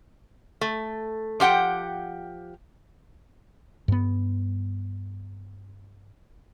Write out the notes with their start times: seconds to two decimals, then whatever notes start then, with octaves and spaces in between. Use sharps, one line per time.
0.61 A3
1.40 F3 G4 F#5 G5
3.88 G2 B3